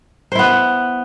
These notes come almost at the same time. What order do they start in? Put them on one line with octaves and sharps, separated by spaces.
C5 E4 B3